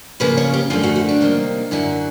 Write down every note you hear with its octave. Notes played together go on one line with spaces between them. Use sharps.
C#3 F3 A#3 C#4 B4
C#5
G4
F#2 D3 F3 A3 F4
F#4
E4
D4
C3 D#3 G3 A#3
F#2 D3 F#3 E4